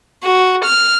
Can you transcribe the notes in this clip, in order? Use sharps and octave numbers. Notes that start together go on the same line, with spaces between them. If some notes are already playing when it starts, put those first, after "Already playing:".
F#4
F6